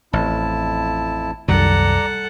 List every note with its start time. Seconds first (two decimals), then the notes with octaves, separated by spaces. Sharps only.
0.13 A1 F2 E4 A5
1.48 C2 F#2 D#3 G3 A4 D5 F#5 A#5